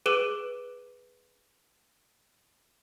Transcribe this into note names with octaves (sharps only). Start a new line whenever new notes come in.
G#4 B4 D6 F#6 D7 E7